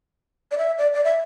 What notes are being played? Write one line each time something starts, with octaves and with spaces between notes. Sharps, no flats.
D5
E5
D5
D5
E5